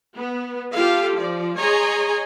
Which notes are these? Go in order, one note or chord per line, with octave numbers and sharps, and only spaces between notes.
B3
F4 G4 A4 F5
F3 D5
G#4 C#5 D#5 G#5 A#5 C6